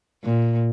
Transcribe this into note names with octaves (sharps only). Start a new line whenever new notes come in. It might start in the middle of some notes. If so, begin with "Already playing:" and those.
A#2